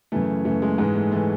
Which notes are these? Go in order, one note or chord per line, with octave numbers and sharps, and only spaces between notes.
F#2 C#3 E3 A3
F#2 C#3 E3 A3
G#3
G#2 E3 G#3
A3
E3 A3